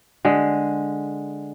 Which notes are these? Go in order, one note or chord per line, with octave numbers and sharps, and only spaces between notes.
D3 G#3